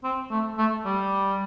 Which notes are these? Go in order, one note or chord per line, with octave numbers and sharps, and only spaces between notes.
C4
A3
A3
G3